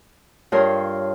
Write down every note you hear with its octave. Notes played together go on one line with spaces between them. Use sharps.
G2 F4 A4 A#4 C#5 C6